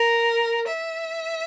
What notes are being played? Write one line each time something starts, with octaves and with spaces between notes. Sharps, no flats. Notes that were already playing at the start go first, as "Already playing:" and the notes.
Already playing: A#4
E5